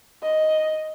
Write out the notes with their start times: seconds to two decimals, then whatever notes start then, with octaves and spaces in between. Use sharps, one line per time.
0.23 D#5